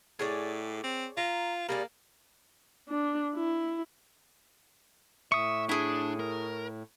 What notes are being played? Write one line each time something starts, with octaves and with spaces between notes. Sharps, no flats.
A2 G#4 C#5 D5
C4
F4 A#5
G3 A#3 G#4 D5
D4
E4
A2 E5 C#6 D#6
D4 E4 G#4
A#4